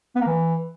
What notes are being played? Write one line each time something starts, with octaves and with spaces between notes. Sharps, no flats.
B3
A#3
E3